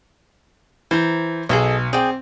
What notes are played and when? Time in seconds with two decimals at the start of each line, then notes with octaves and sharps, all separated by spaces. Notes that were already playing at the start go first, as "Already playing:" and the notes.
0.91 E3 C5 A#5
1.49 B1 G#4 A4 D#5
1.93 C4 G#4 D5 G5